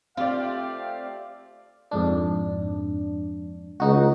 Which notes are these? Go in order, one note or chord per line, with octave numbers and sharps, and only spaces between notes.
A3 C4 F4 G4 D5 F5
F2 G#2 D4
C#2 D#4 F#4